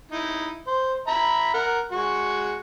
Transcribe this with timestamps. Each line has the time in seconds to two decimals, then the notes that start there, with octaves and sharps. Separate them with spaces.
0.11 D#4 E4
0.67 C5
1.08 E5 A#5 B5
1.54 A#4 F#5
1.92 G#3 F#4 C#6